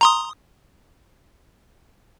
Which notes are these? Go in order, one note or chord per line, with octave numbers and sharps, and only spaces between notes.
A#5 C6 D#6